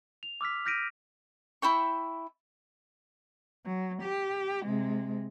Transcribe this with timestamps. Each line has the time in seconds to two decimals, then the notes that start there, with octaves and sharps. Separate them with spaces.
0.23 F7
0.41 D6 E6 F6 B6
0.65 F6 G6 A#6 B6 D7 D#7
1.62 E4 E5 G5 C#6
3.66 F#3
4.02 G4
4.65 C3 G#3